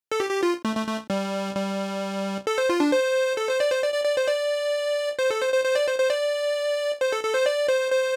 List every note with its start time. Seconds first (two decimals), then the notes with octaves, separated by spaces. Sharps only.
0.12 A4
0.20 G4
0.30 G4
0.43 F4
0.65 A3
0.76 A3
0.87 A3
1.10 G3
1.55 G3
2.47 A4
2.58 C5
2.69 F4
2.80 D4
2.92 C5
3.37 A4
3.49 C5
3.60 D5
3.71 C5
3.83 D5
3.94 D5
4.05 D5
4.17 C5
4.28 D5
5.19 C5
5.31 A4
5.41 C5
5.54 C5
5.65 C5
5.75 D5
5.88 C5
5.99 C5
6.10 D5
7.01 C5
7.12 A4
7.23 A4
7.35 C5
7.46 D5
7.68 C5
7.92 C5